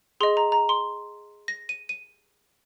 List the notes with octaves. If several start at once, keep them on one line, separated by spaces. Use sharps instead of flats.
G#4 D#5 C6
A#5
A#5
C6
A#6
D#7
D#7